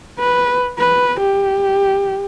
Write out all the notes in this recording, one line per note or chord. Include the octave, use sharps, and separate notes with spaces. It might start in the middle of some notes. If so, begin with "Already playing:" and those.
B4
B4
G4